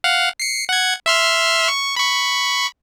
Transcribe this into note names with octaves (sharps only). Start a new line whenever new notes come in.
F5 F#5
C7 C#7
F#5 G#6
E5 C6 F6
C#6
B5 C#6